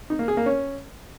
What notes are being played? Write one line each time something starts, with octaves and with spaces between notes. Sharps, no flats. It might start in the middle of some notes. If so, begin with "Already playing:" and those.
D#4
A#3
G#4
A#3
C#4